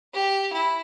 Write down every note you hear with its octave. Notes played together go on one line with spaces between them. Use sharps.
G4
E4